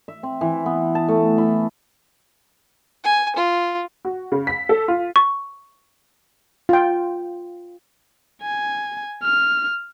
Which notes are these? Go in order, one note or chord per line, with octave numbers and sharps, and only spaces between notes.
E5
C4
E3
B3
A5
A3
E4
G#5
F4
F#4
C#3
B6
A4
F4
C#6
F4 G5
G#5
F6